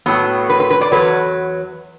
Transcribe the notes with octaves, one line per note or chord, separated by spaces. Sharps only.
A2 F#3 B3
B4
B4
B4
D5
E2 B2 F#3 B4